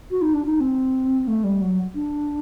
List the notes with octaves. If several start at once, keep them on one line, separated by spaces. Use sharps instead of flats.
F#4
D#4
D4
D#4
C4
A3
G3
F#3
D4